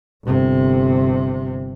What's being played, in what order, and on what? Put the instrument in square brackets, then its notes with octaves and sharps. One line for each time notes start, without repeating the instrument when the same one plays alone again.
[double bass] G1 C3